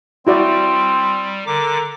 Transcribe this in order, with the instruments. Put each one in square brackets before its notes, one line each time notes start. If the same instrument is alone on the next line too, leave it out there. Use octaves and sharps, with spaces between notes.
[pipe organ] G3 [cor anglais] C4 [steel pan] E4 F#4 D5
[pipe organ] D3 D6 [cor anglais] A#4